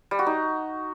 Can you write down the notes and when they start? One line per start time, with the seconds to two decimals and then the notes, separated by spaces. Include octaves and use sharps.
0.11 G3
0.19 F#4
0.26 D#4